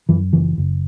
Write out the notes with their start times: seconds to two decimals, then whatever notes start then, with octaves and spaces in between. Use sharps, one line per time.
0.09 F#2 E3
0.33 F#1 E3
0.58 F#1